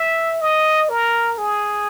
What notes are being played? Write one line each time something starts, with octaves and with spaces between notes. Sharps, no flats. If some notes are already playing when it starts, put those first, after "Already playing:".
Already playing: E5
D#5
A#4
G#4